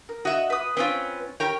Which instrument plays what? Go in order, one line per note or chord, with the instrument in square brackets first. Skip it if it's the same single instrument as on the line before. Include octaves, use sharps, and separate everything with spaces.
[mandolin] A#4
[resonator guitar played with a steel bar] F#4 E5 [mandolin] D#5
[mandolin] B4 D#6
[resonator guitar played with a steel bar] C4 C#4 F4 [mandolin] B4
[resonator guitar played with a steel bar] G4 A#4 C#5 [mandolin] G5